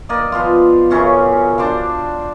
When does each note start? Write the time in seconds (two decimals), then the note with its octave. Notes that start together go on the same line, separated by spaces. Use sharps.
0.09 A#3 D5 D#5
0.32 F3 B3 F4
0.90 F#2 C#3 C#4 F4
1.58 D4 C5 D5 F5